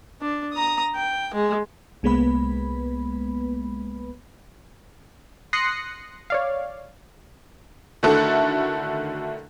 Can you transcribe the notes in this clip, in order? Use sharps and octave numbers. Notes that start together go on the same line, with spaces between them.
D4
A#5 D#6
G5
G#3
C2 G#3 A#3 B3 B4 B5
C6 D#6 F#6 A#6 C7 C#7
C#5 D5 F5
D3 D#3 A3 E4 F#4 A4